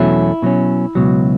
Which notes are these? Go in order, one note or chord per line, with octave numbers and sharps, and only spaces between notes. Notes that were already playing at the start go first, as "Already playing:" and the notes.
Already playing: E2 B2 F#3 A3 C#4 E4
B2 F#3 C#4
C#2 B2 F#3